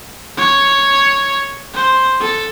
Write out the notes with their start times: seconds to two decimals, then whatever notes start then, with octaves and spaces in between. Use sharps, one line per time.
0.37 C#5
1.74 C5
2.21 A4